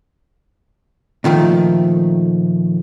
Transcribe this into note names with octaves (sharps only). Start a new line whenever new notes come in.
A#2 D#3 F3 A3